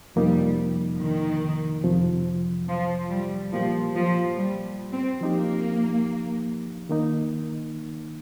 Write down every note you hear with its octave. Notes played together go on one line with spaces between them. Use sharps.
F2 C3 F3 G3 A#3 D#4
D#3
F2 C3 F3
F3
G3
A#2 F3 A#3 G4
F3
G3
C4
F3 A#3 D#4 G4
D#3 A#3 D#4